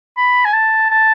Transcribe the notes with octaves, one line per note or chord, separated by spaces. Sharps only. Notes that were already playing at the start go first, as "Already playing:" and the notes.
B5
G#5
A5
A5